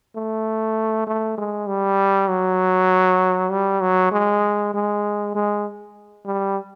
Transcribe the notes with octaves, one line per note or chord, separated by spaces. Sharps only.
A3
A3
G#3
G3
F#3
G3
F#3
G#3
G#3
G#3
G3